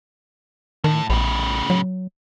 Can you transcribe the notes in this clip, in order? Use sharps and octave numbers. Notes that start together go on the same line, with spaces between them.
A2 D#3
A#1 A2 C#3
F#3